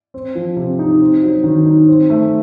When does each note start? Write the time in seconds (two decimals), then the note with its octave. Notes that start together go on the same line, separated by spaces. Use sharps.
0.14 C4
0.35 F3
0.57 C3
0.79 D#4
1.01 C4
1.23 F#3
1.44 D#3
1.66 D#4
1.88 C4
2.10 A3